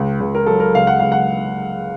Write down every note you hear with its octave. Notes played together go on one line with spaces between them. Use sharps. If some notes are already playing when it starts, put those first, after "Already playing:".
Already playing: C#2
C#2
A#4
F#3 A4
A#4
C#2 F5
F#5
C#2 F5
F#5